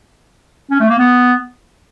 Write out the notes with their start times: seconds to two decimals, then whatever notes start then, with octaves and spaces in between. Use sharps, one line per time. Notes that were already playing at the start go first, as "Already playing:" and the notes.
0.71 C#4
0.80 A3
0.89 A#3
0.99 B3